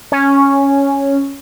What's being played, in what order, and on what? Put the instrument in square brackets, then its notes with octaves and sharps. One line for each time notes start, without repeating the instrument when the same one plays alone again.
[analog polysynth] C#4